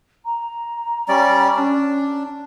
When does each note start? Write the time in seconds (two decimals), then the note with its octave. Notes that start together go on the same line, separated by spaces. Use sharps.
0.25 A#5
1.08 G3 C#4 D5
1.56 C#4 D4